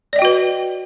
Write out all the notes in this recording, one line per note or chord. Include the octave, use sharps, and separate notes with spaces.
F#4 B4 D5 D#5 G5